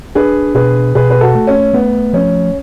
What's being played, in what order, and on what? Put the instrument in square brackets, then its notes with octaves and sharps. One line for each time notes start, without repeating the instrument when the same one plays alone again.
[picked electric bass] D4 [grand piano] G#4 B4
[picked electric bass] B2 [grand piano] G#4 B4
[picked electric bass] B2 [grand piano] G#4 B4
[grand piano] B4
F#4 A4
[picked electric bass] A3
[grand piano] C#4
[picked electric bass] A3 [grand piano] B3
[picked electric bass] F3 [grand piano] C#4